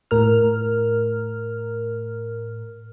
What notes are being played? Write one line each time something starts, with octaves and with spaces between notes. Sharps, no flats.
A2 A#4 F6